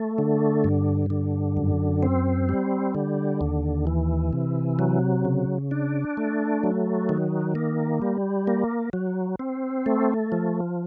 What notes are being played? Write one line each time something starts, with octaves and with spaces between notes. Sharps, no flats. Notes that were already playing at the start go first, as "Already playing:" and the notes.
Already playing: A3
D3
G2
D3
F#2
C4
G3
D3
D#2
E3
C3
F#3
C#3
D4
A3
F#3
D#3
A#3
G3
A#3
F#3
C4
A3
F3